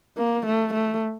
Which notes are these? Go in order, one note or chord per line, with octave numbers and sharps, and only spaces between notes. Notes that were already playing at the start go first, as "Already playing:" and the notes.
A#3
A3
A3